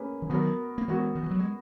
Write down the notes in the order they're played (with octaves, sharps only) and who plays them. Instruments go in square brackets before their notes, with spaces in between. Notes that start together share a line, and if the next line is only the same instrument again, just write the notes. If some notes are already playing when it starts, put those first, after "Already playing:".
Already playing: [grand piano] A#3 C#4 G#4 B4
[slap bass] E3
[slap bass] D#3 F#3 [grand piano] B3 F#4 A#4
[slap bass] A#3
[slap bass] E3 G#3 [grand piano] B3 F#4 A#4
[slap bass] D#3
E3
F#3
G#3